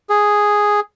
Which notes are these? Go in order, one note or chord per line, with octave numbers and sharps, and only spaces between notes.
G#4